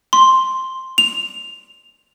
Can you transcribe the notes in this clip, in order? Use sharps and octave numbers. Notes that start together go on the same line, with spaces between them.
C6
F7